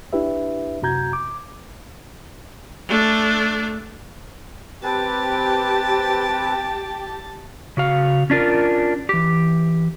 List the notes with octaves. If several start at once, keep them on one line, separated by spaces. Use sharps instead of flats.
D4 E4 G4 B4 E5
F#2 C3 F#4 A#5 G6 G#6
D6
A3 D4
C4 G4 B4 G5 A5
C#3 F#4 F5
C#4 D4 F4 A#4
E3 G4